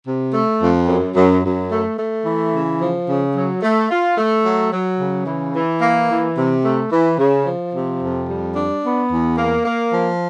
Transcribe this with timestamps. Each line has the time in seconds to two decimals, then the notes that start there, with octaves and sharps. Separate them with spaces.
0.06 C3
0.34 A3
0.61 F2
0.88 F#2
1.16 F#2
1.43 F#2
1.70 A3
1.98 A3
2.25 E3
2.53 C#3
2.80 F3
3.07 C#3
3.35 F#3
3.62 A3
3.89 F4
4.17 A3
4.44 F#3
4.72 F#3
4.99 C#3
5.26 E3
5.54 E3
5.81 A#3
6.09 E3
6.36 C3
6.64 A3
6.91 E3
7.18 C#3
7.46 F3
7.73 C3
8.01 F2
8.28 G3
8.55 D4
8.83 B3
9.10 E2
9.37 A#3
9.65 A#3
9.92 F3